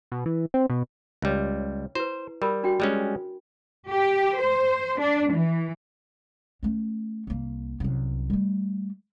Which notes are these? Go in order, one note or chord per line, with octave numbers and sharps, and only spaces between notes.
B2
E3
C4
B2
C#2 G3 C#5
E4 B4 C5
G3 A#4 B5
D4 F#4 G5
G3 G#3 C#4
G4
C5
D4
E3
A3 C#4
C2 A#3
C2 F#2
G3 A3